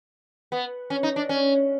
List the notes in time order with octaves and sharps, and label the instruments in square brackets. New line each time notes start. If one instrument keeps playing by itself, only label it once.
[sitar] B3
C#4
D#4
D4
C#4